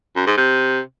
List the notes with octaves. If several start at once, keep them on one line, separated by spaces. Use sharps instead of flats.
F#2
G#2
C3